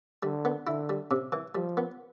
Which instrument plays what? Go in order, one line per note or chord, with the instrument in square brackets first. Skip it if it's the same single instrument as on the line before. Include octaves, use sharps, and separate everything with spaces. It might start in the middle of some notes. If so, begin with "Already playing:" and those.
[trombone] D3 [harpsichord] G3
[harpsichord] B3
[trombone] D3 [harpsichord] E4
[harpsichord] G3
C3
E3
[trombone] F3 [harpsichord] G3
[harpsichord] B3